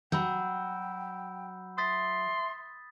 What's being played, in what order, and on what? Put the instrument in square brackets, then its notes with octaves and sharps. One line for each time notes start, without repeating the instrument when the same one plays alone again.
[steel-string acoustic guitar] F#3 [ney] G5 [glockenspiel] B5 E6 G6
[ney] E5 [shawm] C6 [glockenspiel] D#6 A6 B6